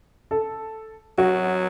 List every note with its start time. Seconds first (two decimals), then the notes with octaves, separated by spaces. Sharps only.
0.31 A4
1.18 F#3 F#4